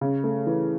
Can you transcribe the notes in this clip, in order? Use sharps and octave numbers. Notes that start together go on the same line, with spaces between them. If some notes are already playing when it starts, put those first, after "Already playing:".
C#3
A3
E3